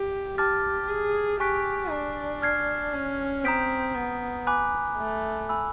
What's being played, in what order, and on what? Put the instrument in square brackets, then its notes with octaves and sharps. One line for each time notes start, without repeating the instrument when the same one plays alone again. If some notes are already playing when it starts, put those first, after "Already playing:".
Already playing: [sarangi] G4
[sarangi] G4 [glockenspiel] A5 D6 F6 A6
[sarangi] G#4
[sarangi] G4 [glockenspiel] G#5 C#6 F#6 B6 D7
[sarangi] D4
[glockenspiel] F6 G#6 C7
[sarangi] C#4
[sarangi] C4 [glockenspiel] A#5 D#6 G6 B6 D7
[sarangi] B3
[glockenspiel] G#5 B5 D6 F#6
[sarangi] A3
[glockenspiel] G#5 B5 E6